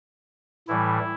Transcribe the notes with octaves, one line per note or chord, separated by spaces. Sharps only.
A2 E3 G3 E4